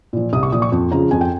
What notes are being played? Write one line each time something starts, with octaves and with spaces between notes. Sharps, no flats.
A#2 F3
C2 D#6
C#6
A#2 F3 D#6
C#6
F2
C#3 F3 A#5
F2 G#5
G5